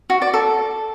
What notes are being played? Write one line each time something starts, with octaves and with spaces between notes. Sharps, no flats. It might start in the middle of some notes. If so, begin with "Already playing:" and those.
F#4
D5
A4